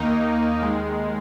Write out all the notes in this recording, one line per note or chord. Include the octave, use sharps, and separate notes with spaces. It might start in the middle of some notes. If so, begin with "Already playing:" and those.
Already playing: D#2 D#3 A#3 D#4
D#2 D#3 G#3